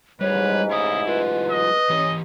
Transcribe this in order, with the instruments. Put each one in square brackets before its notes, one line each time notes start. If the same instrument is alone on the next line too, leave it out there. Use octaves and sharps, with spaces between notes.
[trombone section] A1 G#2 [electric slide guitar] G3 G#3 [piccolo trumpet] B4 [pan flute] C#5
[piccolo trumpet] E4 [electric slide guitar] C#5 F5 [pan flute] D#6
[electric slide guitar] F#3 F4 [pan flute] B4
[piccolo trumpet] D#5
[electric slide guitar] E3 G4 [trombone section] C#4